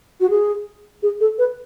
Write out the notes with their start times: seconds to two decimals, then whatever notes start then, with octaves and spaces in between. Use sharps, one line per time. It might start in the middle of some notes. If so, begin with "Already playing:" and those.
0.20 F#4
0.30 G#4
1.03 G#4
1.20 A4
1.38 B4